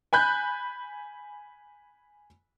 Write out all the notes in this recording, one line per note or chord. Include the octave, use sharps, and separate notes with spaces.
G#5 B5 F#6 G6